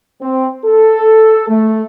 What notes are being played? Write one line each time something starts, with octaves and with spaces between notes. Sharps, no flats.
C4
A4
A3